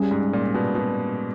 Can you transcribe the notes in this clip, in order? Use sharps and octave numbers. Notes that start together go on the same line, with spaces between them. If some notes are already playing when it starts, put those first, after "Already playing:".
Already playing: G3 C#4 G#4
G#2
A#2
B2
B2